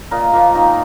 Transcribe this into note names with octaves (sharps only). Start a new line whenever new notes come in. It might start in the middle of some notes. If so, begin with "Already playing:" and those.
A#2 A#4 D#5
F3 A#3 F4 A#4
D#3 D#4